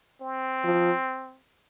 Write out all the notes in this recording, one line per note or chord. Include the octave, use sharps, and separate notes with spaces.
C4
F3